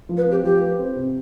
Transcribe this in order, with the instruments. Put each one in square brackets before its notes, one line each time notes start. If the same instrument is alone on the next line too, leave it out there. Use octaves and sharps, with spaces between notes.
[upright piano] F3
[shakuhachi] B4
[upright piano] C4 [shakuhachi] G4
[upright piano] F3 [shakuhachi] G4
[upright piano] B4
C4
C3